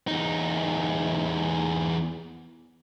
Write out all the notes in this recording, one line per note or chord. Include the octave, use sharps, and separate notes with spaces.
E2 D#4